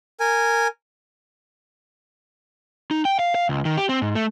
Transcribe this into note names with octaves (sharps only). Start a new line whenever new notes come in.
A#4 G#5
D#4
G5
F5
F5
C#2
D#3
G4
C4
G#2
A3